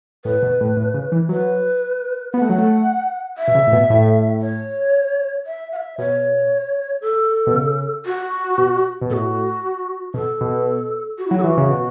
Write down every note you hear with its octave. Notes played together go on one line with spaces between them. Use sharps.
A2 B4
B2
A2
A2
C#3
E3
F#3 B4
B3 F#5
A3
F#3
A3
E5
B2
C#3
A2
B2
A2
C#5
E5
F#5
E5
B2 C#5
A4
B2
C#3
F#4
B2
B2
A2 F#4 A4
B2 A4
B2
F#4
F#3 E4
A4
E3 F#4
C#3
B2